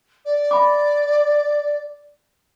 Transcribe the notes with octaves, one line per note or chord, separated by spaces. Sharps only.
D5
E5 B5 D6